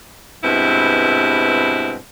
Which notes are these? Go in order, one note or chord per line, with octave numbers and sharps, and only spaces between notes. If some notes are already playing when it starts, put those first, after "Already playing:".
G2 B2 G#3 C4 E4